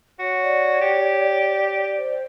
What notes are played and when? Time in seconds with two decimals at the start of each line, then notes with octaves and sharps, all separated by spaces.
0.19 F#4 C#5
0.43 D5
0.81 G4
1.97 C5